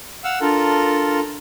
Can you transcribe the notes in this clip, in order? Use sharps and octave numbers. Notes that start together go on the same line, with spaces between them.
F5 F#5 E6
D4 F4 A4 A#4